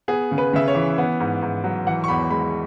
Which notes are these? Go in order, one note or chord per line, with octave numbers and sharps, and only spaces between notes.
B3 G#4
C#3
B4
C#3 E5
C#5
E3
B3
G#2
G#2
F#3
E3 F#5
C#6
E2 B5
G#3 B5